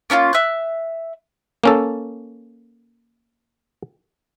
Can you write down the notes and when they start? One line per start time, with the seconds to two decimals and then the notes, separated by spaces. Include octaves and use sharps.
0.10 A#3 C#4 D4 F4
0.33 E5 F#6
1.64 A#3 C#4 A4